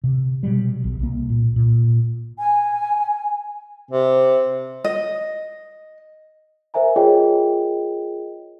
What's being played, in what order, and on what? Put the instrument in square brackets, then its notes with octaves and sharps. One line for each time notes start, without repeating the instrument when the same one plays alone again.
[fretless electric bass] C3
B2 F#3 G3
B1
C2 A#3
A#2
A#2
[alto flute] G#5
[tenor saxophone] C3
[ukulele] D#5
[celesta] A#4 C5 E5 G#5 A#5
F4 G#4 A#4 C#5 D#5 G5